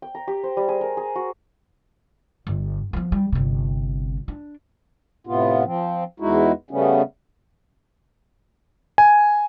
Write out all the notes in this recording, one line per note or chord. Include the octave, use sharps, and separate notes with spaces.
G5
A#5
G4
C5
G3
G#4
A#4
G#4
F#4
G1
F3 B3
G3
G1 C3
D4
A2 C3 B3 F4
F3 C4
E2 G#3 D#4 E4 F#4
C#3 G3 A3 B3 C#4
G#5